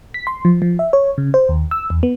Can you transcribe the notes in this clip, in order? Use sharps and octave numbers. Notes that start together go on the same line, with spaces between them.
B6
C6
F3
F3
E5
C#5
C#3
C5
D#2
E6
E2
B3